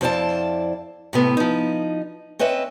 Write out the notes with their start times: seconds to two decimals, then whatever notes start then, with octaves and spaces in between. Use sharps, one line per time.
0.01 F2 E4 C5 D5 F5 A5
1.13 A2 C3 B3 A4
1.37 F3 D#4
2.39 C4 C#4 B4 D#5 E5